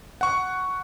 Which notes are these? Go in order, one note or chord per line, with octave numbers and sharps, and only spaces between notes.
F#5 C#6